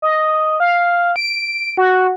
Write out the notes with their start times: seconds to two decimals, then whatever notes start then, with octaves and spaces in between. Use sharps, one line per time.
0.02 D#5
0.60 F5
1.16 D7
1.77 F#4